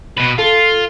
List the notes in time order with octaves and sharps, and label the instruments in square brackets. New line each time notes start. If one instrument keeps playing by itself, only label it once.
[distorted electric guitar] B2 B4
[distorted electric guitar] F4 [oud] A4